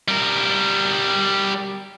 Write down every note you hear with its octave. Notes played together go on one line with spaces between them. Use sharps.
G3 A#4